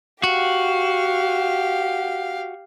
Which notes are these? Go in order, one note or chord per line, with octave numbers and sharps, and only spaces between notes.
F#4 G4 F5